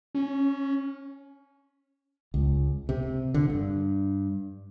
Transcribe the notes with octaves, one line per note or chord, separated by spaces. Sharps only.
C#4
C#2
C3
D3
G2